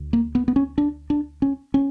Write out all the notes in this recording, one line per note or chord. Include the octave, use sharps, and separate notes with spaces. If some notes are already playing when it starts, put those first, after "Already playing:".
Already playing: D2
A#3
B3
B3
C#4
D4
D4
C#4
C#4